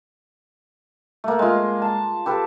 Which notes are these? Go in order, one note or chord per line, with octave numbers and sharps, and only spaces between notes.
A3 A#3
G#3 F4
A5
G4 A4 B4